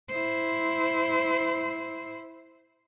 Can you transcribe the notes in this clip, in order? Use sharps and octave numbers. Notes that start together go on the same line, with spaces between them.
E4 C5